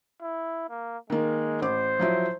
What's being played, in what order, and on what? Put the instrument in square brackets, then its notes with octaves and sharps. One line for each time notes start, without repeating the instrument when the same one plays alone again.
[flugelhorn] E4
A#3
[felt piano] D#3 A#3 [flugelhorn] G#3
[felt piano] A1 D6 [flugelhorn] C5
[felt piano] F3 F#3 E4